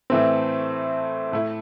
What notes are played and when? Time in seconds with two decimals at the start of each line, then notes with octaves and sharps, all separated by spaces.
0.10 A2 E3 A3 C4
1.32 A2 A3 E4